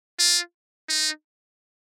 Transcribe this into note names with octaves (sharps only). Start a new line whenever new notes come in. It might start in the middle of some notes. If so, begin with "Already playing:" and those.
F4
D#4